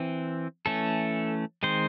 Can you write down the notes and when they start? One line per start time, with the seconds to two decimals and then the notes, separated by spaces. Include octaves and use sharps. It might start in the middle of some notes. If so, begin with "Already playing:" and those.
Already playing: E3 C4
0.66 E3 A3 C#4 A4
1.63 D#3 G#3 C4 C5